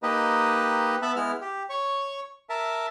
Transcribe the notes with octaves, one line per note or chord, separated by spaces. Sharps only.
A#3 D#4 G4 B4 D#5
B3 E5 A5 B5
G#3 B3 E4 F6
G4
C#5 C#6
A#4 E5 A5